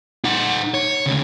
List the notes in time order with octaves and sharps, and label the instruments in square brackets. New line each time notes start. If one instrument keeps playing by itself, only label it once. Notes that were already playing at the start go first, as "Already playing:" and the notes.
[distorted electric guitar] D#4 F#5
C#5
D2 C#3